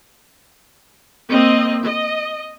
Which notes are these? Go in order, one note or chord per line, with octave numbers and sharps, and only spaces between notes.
A#3 C4 D#5
D#5